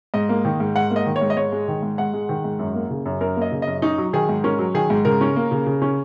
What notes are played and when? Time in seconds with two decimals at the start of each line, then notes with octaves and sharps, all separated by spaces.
0.14 G#2 D#5
0.29 A#3
0.45 D#3
0.60 G#2
0.76 G#2 F#5
0.91 A#3
0.96 D#5
1.06 D#3
1.16 C#5
1.22 G#2
1.30 D#5
1.37 G#2 C#5
1.52 G#3
1.68 D#3
1.83 G#2
1.98 G#2 F#5
2.14 G#3
2.29 D#3
2.44 G#2
2.59 F#2
2.75 A#3
2.90 C#3
3.06 F#2
3.21 F#2 A#4
3.37 A#3 D#5
3.52 C#3
3.62 F#2 D#5
3.82 C#4 D#4
3.98 F#3
4.13 D#3 G#4
4.29 G#2
4.44 C#4 A#4
4.59 F#3
4.74 D#3 G#4
4.90 G#2
5.05 C#3 A#4
5.21 C#4
5.36 A#3
5.51 C#3
5.66 C#3
5.82 C#4